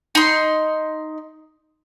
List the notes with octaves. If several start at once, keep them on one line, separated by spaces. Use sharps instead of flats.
D#4 C6